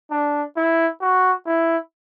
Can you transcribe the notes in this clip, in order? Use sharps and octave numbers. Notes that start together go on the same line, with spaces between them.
D4
E4
F#4
E4